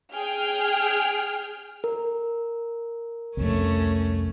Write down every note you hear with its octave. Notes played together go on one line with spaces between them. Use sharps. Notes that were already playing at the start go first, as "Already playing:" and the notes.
G#4 G5 F6
A#4
C2 F2 A3 C#4